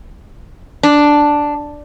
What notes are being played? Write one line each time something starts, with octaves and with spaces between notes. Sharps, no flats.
D4